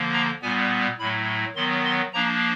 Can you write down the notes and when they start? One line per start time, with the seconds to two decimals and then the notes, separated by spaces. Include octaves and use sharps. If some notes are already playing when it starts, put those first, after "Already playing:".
Already playing: D3 F3 A#3
0.13 A#5
0.42 A#2 G3 B3 G#5
0.99 A2 F#3 A3 B5
1.56 D#3 F#3 B3 C6
1.85 C6
2.13 F3 A#3 D4 A#5